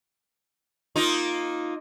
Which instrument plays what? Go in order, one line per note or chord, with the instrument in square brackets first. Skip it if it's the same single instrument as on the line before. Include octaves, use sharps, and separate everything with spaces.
[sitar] A#3 D#4 F4